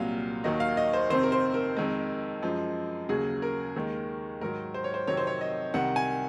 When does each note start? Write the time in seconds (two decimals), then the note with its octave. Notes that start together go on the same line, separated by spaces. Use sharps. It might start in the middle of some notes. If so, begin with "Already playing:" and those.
Already playing: C2 A#2 F#3 F5
0.44 D#2 D#3 F#3 D#5
0.60 F5
0.77 D#5
0.93 C5
1.10 F2 C3 D#3 C5
1.23 A#4
1.32 C5
1.54 A#4
1.77 F2 D#3 G#3
2.42 F#2 F3 G#3
3.09 D#2 C#3 F#3 G#4
3.42 A#4
3.76 D#2 D#3 G#3
4.41 G#2 D#3 F#3 A#4
4.74 C5
4.84 C#5
4.94 C5
5.07 F2 C3 D#3 F#3 C#5
5.17 C5
5.27 C#5
5.41 D#5
5.74 C2 C3 D#3 F#5
5.96 G#5